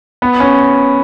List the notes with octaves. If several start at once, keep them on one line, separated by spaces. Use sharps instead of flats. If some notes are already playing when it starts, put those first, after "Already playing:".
B3
C#4